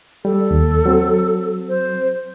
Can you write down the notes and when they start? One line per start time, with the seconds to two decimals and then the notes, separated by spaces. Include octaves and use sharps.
0.25 G3 A4
0.51 D#2
0.86 F#3 C4
1.69 C5